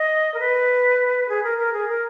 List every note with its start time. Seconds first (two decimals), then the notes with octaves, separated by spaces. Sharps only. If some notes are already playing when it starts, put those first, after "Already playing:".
Already playing: D#5
0.34 A#4
0.39 B4
1.29 G#4
1.43 A#4
1.58 A#4
1.73 G#4
1.88 A#4